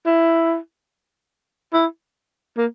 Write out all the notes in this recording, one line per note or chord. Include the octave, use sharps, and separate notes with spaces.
E4
E4
A#3